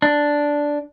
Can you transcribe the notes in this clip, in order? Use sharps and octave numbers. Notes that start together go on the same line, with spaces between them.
D4